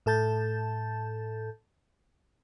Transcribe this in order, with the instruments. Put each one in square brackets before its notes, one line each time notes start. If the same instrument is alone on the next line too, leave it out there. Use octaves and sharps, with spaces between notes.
[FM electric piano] A2 A4 A5 G6 A6